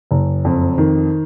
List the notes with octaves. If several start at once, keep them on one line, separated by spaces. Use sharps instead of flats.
F#1
F2
D#3